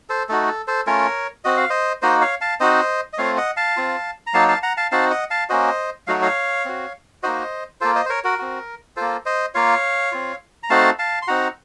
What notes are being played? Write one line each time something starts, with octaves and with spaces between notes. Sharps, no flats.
A4 C5
A3 D#4 F#4 A4
A4
A4 C5
A3 C#4 F4 A#4 C#5
C4 F#4 D#5
F5
C5 D#5
A#3 D#4 F#4 C5 D#5
C#5 F5
F5 A5
C4 D#4 F#4 C5 D#5
D#5
A3 C4 F4 C#5 F5
D#5 F#5
F5 A5
C4 F4
A#5
F#3 A#3 D#4 F5 A5
F5 A5
F#5 A#5
F5 A5
C4 D#4 F#4 F5 A5
D#5 F#5
F5 A5
A#3 C#4 F#4 C5 D#5
F#3 A3 D#4 F#4 F5
F#5
C#5 F5
C4 F#4
A#3 D#4 F#4 C5 D#5
A#3 F4 A4 C5
C5 D#5
C5
A#4 C#5
F#4 A#4
C4 F#4
A#3 F4 A4 C5
C5 D#5
A#3 F4 C#5 F5
C4 F4
A#5
A3 C4 D#4 F#4 F5 A5
F5 A5
C6
C4 D#4 F#4 F#5 A#5